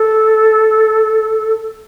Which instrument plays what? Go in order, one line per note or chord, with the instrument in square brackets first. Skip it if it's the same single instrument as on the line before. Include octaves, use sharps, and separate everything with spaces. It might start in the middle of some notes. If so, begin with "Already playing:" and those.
Already playing: [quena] A4